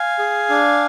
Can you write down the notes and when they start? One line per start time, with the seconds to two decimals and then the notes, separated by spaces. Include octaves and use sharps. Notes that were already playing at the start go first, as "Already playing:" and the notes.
Already playing: F5 G#5
0.19 G#4
0.50 D4